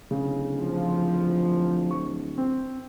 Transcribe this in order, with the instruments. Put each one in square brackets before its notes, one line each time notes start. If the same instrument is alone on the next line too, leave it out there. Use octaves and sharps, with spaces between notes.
[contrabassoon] D1 [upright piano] C#3
[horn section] F3
[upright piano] C#6
C4